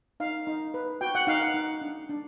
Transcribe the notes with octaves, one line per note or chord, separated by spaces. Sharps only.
D#4 F5
D#4
B4
F#4 G5
F#5
D#4 F5
F#5
D#4
D4
D4